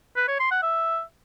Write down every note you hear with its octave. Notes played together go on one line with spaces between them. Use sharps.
B4
C#5
C6
F#5
E5